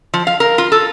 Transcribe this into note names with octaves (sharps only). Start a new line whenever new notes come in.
F3
F5
A#4
F4
A4